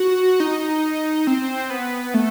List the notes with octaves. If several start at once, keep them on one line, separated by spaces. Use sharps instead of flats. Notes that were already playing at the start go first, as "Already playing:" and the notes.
Already playing: F#4
D#4
C4
B3
A3